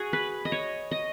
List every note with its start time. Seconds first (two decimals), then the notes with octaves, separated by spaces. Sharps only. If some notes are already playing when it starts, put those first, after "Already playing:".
Already playing: F#4 G#4
0.13 B4
0.45 D#5
0.52 C#5
0.91 D#5